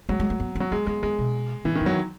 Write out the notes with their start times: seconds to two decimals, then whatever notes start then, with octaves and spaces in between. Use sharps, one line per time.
0.09 F#3 G#3
0.20 G#3
0.30 A3
0.40 B3
0.55 F#3 C#4
0.72 G#3 B3
0.87 G#3 B3
1.03 D#3 G#3
1.18 B2
1.65 A2 E3
1.76 D#3
1.81 F#2
1.86 F#3